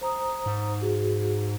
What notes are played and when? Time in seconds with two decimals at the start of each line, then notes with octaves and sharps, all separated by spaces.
0.01 C5 A#5 D#6
0.46 G#2
0.81 F#4 G#4